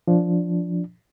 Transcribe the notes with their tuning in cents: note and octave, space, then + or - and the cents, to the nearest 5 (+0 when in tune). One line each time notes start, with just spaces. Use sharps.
F3 +0 D4 -10